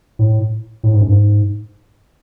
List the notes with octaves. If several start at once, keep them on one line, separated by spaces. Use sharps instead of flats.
A2
A2
G#2
F#2
G#2